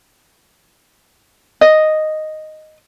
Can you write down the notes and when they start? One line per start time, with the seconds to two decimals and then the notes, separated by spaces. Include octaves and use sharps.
1.61 D#5